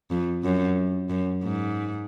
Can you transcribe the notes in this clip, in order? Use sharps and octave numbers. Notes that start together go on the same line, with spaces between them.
F2
F#2
F#2
G#2